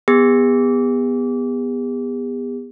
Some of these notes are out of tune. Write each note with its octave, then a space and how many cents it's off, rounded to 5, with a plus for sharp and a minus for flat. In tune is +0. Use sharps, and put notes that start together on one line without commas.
B3 +0 G#4 -45